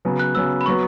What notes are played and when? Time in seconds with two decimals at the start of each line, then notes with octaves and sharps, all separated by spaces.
0.05 C#3 F#3 B3
0.19 F#6
0.35 C#3 F#3 B3 E6
0.61 B5
0.66 F#3 B3 C#6